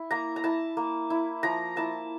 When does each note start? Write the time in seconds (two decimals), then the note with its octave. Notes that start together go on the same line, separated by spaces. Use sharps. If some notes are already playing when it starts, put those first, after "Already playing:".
Already playing: E4
0.11 A#3 A#5
0.36 A#5
0.44 E4 A5
0.77 A#3
1.10 E4
1.43 F3 A#5
1.76 A#3 E4 A5